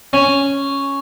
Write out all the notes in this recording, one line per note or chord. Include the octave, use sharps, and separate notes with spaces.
C#4